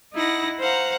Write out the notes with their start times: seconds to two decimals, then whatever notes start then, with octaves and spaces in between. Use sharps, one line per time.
0.14 D#4 E4 F#5 A#6
0.60 C5 F5 F#5 A#5